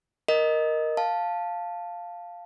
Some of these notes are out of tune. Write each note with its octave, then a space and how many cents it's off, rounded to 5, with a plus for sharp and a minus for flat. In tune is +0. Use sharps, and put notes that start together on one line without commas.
A#4 +0 D#5 +0
F5 +0 A5 +0